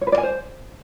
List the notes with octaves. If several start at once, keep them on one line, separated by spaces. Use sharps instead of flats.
C#5
B4
D5
G#5
C5